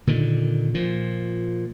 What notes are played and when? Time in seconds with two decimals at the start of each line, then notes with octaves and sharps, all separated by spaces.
0.07 A#2 D3 D#3
0.74 A#2 F3